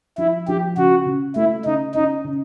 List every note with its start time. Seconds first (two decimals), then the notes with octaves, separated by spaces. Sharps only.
0.18 F3 E4
0.48 F3 G4
0.77 C#3 F#4
1.06 C#3
1.36 A3 E4
1.65 C#3 D#4
1.95 C#4 D#4
2.24 C#3